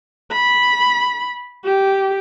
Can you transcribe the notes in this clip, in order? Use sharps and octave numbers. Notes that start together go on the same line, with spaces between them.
B5
G4